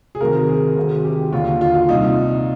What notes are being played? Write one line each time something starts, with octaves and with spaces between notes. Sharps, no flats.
G#4
D2 C3 D#3 A#4
G#4
D2 C3 D#3
G4
D#2 D3 F4
F4
F4
C2 A#2 D#4